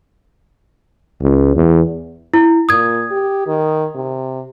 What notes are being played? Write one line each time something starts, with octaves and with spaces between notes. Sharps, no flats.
C#2
E2
E4
A#2 D#6 G#6
G4
D#3
C3